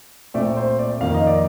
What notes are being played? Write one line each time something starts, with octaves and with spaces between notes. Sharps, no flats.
A#2 A3 C4 D5
C5
D5
F2 D#3 A#3 F5
D#5
D5